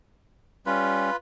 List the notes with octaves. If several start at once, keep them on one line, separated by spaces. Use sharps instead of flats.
G3 C#4 F4 B4